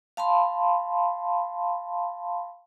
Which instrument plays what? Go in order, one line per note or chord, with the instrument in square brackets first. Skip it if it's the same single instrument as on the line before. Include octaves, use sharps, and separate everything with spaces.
[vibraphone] F5 A5 B5 C6